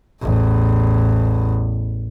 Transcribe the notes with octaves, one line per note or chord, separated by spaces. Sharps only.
A1 E2